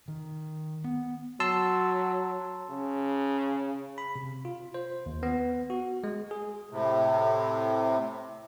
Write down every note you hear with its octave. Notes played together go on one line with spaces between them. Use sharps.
D#3
B3
F#3 A5 C6 E6
C#3
B5
C3
F4
C5
D#2
B3
F#4
G#3
G#4
A2 C3